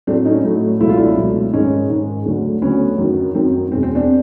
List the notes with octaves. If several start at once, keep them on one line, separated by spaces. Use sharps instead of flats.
A2 F#3 A3 C4 D4
C#4 D#4
A2 F#3 A3
C#2 B2 F#3 A3 E4
F4
D4 E4
C#2 B2 F#3 A3
G#2 D#3 G#3 C#4 D#4
G#2 D#3 G#3
D2 D3 F#3 A3
D2 D3 F#3 A3 B3 C#4
F#2 D#3 F#3
F#2 D#3 F#3 C4
E2 B2 G#3 C4
C4
C4 D4